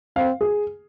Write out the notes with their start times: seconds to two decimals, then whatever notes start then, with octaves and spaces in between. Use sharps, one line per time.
0.16 C4 F5
0.41 G#4